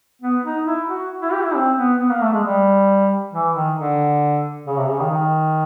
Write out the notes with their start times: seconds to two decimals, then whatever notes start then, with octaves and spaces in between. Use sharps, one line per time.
0.21 B3
0.44 D#4
0.66 E4
0.88 F#4
1.22 E4
1.33 G4
1.44 E4
1.55 C4
1.78 B3
2.00 B3
2.10 A#3
2.21 A3
2.33 G#3
2.44 G3
3.33 E3
3.55 D#3
3.78 D3
4.67 C#3
4.77 C3
4.88 C#3
5.00 D#3
5.10 D#3